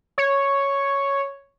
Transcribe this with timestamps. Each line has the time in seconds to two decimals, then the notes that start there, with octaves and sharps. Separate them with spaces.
0.18 C#5